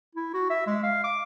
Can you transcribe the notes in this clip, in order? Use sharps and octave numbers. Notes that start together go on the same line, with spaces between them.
E4
F#4
E5
G#3
F5
D6